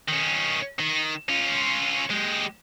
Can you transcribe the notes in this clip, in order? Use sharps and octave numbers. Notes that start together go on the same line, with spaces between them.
D#3 C#4
D#3
C#4 F4
G#3 G4